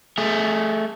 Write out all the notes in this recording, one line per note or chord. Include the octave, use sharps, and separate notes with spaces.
A3 G#4